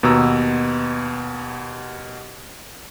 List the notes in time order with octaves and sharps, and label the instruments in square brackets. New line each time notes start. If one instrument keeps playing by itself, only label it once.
[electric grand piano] D#2 B2 B3 A#5 E6